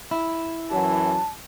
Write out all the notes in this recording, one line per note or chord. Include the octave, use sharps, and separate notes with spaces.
E4
F#2 E3 F#3 A5